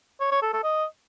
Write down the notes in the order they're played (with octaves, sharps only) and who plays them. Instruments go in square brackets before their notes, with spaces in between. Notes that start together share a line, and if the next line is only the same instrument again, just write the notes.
[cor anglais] C#5
C#5
A4
A4
D#5